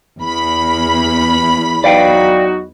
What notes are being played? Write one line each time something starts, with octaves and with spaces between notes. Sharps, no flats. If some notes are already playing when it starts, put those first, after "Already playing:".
E2 B5
F#3 D#4 F#4 D5 F5 G5